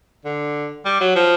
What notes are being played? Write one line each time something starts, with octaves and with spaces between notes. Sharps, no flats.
D3
G3
F#3
F3